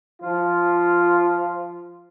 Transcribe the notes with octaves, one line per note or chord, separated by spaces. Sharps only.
F3 F4